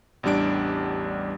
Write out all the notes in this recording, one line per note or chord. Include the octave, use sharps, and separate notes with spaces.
A1 E2 G3 D4 D7